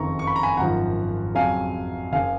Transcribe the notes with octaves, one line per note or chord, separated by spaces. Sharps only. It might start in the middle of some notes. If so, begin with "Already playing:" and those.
Already playing: F#1 F2 D#3 A#5 C#6
C#6
B5
A#5
G#5 B5
G#1 F#2 F3 F#5 A#5
F2 C#3 F#3 F5 G#5
F#1 C#3 F5 G#5